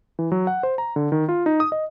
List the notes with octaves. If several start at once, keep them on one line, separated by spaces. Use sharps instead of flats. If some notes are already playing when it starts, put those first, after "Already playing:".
E3
F#3
F#5
C5
A#5
D3
D#3
F4
D#4
D#6
D#5